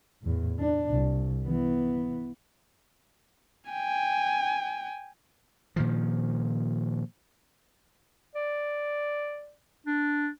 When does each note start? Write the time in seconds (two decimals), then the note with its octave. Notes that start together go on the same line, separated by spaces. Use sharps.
0.22 E2 A2
0.59 D4
0.90 C2
1.45 E3 B3
3.70 G5 G#5
5.76 A#2 D#3 F3
8.35 D5
9.87 D4